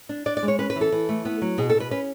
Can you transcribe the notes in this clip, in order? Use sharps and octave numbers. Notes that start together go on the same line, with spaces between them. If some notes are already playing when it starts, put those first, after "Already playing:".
D4
D4 D5
D5
G#3
C#5
C#4 B4
B4
E3
A4
E3
A3
B3
F#3
B2 G#4
A4
B2
B4
C#4 B4